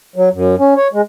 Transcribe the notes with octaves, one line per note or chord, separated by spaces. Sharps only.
F#3
F#2
C#4
C#5
G#3